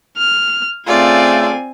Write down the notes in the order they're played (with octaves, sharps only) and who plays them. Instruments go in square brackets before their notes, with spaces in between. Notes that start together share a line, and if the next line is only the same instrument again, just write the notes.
[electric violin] F6
[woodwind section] C#3 A3 A4 [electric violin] C4 G#5 [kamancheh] F4 D5